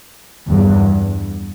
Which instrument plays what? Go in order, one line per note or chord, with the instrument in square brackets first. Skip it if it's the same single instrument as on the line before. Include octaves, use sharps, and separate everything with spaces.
[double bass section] E2 G2